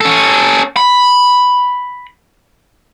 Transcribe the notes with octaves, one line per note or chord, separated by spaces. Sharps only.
C#4 A4
B5